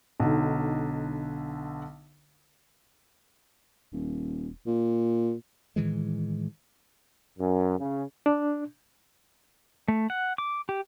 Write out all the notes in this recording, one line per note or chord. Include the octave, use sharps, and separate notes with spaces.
B1 D3 D#4
D#1
A#2
A2 D#3 E3 G#3
F#2
C#3
D4
A3
F#5
D6
G4